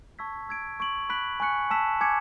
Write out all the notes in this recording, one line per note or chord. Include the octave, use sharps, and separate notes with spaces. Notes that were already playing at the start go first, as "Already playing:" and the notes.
A5 C#6 E6 G#6 B6
E6 G#6 D7
C#6 G#6 D7 F#7
B5 F#6 B6 D7 F#7
G#5 C#6 F#6 C#7
A5 E6 B6 E7
G#5 D6 G#6 C#7